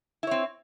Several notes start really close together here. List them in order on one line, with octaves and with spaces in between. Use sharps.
E4 C#5 C4